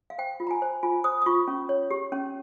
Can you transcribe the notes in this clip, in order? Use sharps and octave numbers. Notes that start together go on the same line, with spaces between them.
F5
C5 G5
F4
A#5
G#5
C5
F4 G#5
C5 D#6
D#6
F4 C#6
C#4
C#5
G4
C#4